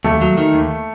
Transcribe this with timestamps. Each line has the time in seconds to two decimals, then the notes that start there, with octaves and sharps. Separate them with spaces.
0.04 D#2 A3
0.21 F#3
0.37 D#3
0.54 D#2